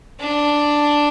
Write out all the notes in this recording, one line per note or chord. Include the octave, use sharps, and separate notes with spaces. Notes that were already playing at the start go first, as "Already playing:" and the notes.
D4